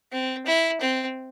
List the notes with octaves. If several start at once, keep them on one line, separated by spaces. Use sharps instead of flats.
C4
E4
C4